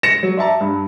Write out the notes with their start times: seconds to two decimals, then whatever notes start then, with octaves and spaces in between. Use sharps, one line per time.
0.03 A#6 C#7 E7
0.23 F#3
0.37 D5 E5 A5 A#5
0.61 G2